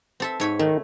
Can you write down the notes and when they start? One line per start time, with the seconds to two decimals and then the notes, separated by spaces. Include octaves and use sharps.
0.20 C4 A4 E5
0.40 G#2 C#5 B5
0.59 D#3 A3